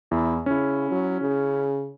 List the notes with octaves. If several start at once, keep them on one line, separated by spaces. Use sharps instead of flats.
E2 E4
C#3 C#4 E4
F#3
C#3